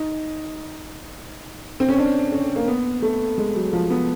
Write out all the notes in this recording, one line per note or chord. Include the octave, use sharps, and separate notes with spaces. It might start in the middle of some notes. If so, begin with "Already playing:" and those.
Already playing: D#4
C4
C#4
D4
C#4
A#3
B3
A3
G#3
F#3
F3
B3